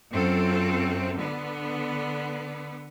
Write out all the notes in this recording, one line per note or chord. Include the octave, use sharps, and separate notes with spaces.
F#2 C4 F4 A4
D3 B3